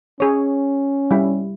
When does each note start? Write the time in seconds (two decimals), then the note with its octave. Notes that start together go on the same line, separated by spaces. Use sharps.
0.20 C#4 G#4 C#5
1.11 G3 E4